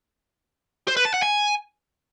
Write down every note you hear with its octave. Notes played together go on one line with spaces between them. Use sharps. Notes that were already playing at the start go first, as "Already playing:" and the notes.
C5
B4
A5
F#5
G#5